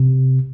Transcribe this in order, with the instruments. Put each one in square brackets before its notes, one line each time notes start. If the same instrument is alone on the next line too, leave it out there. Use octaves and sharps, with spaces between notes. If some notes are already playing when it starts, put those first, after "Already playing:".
Already playing: [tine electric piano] C3